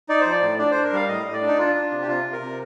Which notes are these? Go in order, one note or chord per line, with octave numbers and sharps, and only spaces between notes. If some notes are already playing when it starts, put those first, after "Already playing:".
D#4 D5
F3 C5
D5
A2
D4 D5
D4 C5
A#4
G3 F5
A2 D#5
A2
D5
D4
D#4
D4 F4
D4
C3
G4
C3 F4
C3
A#4
C3